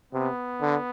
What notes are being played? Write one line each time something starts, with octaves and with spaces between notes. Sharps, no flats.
C3 B3
D3